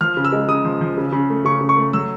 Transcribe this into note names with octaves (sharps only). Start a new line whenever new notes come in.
F3 F6
C#3
E6
G#3
C#3 D#6
F3
F3
C#3
C#3
A3
C#3 C#6
C#3
C#6
A3
F#3 E6